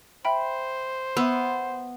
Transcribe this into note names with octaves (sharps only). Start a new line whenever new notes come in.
C5 E5 G5 B5
B3 E5 C6 E6